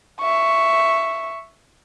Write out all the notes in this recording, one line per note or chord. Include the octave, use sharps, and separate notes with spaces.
E5 C#6